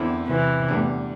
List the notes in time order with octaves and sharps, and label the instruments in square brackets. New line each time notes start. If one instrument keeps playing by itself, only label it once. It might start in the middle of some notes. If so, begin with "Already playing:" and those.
Already playing: [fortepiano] E2 D3 C4 E4
[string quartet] C3 E3
[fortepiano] E2 D3 G3 D4